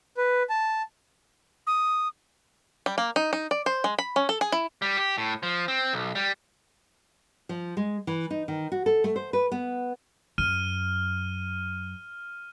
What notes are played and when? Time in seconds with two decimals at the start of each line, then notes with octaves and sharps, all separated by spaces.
0.17 B4
0.50 A5
1.67 D#6
2.86 G3
2.98 A#3
3.16 D#4
3.33 D#4
3.51 D5
3.66 C5
3.84 G#3
3.99 B5
4.16 C#4
4.29 A4
4.41 G#4
4.52 E4
4.82 G3
4.97 G4
5.18 A2
5.43 F3
5.68 C4
5.93 B1
6.15 G3
7.49 F3
7.77 G#3
8.07 E3
8.30 D#4
8.48 D#3
8.72 F#4
8.86 A4
9.04 A3
9.16 C5
9.33 B4
9.52 B3
10.38 F#2 F6 D#7